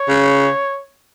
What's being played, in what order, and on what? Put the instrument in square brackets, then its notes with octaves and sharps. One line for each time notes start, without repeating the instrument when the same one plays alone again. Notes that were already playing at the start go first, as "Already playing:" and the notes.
Already playing: [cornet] C#5
[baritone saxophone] C#3